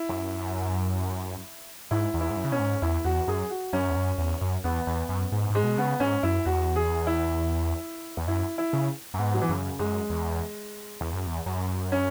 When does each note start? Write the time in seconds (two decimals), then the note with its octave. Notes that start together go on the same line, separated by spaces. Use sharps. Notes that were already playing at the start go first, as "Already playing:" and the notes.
Already playing: E4
0.09 F#2
1.91 G#2 E4
2.14 E2
2.21 E4
2.31 G#2
2.37 F#2
2.44 C#3
2.52 B2 C#4
2.60 G#2
2.82 E2 E4
3.04 E2 F#4
3.28 F#2 G#4
3.50 F#4
3.73 F#2 C#4
3.90 E2
3.96 F#2
4.18 E2
4.41 F#2
4.64 E2 B3
4.87 E2
5.09 F#2
5.32 G#2
5.50 G#2
5.55 G#3
5.64 B2
5.78 C#3 B3
6.00 G#2 C#4
6.23 F#2 E4
6.45 E2 F#4
6.76 G#4
7.07 E4
8.17 E2
8.27 F#2 E4
8.58 E4
8.73 C#3
9.14 F#2
9.19 G#2 B3
9.34 F#3
9.41 E3
9.49 F#2 C#3
9.79 F#2 G#3
10.10 E2
11.01 E2
11.13 F#2
11.27 E2
11.46 F#2
11.92 C#4